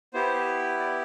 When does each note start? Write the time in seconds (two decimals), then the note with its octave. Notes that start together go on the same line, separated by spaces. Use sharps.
0.13 B3 E4 G4 C5
0.80 D5